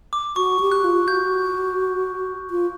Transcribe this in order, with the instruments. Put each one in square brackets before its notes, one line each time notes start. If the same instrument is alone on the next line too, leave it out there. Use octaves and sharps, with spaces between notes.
[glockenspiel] D6
[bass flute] F#4 [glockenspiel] C#6
[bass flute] G4
[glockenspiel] F#6
[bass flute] F4
[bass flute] F#4 [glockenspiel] G6
[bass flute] F4